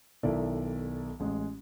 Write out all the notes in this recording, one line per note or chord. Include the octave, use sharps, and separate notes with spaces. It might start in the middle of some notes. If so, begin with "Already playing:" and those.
B1 D#3 E4 A4 D5
A1 G#3